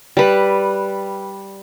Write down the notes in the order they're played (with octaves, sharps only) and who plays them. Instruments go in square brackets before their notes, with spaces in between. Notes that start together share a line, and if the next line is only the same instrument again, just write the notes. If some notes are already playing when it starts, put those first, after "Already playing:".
[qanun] G3 B4